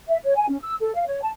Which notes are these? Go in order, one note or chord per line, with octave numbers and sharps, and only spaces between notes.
E5
C#5
G#5
C#4
E6
A4
F5
C#5
A5